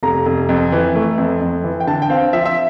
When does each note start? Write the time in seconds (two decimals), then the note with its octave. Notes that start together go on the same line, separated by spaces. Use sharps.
0.03 F1 A#5
0.26 F1
0.49 F2
0.72 E3
0.95 A3
1.18 F2
1.41 F2
1.64 E3
1.80 G5
1.87 D3 A5
2.02 G5
2.10 C4 F5
2.33 F3 E5
2.46 E5